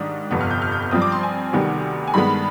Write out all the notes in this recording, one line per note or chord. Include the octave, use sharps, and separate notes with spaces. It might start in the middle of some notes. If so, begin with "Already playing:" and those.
Already playing: G#2 D#3 G3 D4 D#6
G1 F2 C3 F3 B3
F6
G6
F6
G6
F6
G2 F3 C4 D#6
D6
C6
G#5
D2 C3 D#3 G3 B3
G#5
G2 D#3 G#3 B3 B5